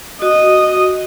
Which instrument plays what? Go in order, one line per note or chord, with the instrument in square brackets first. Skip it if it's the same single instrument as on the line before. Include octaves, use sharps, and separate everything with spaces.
[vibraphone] F#4 [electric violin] D#5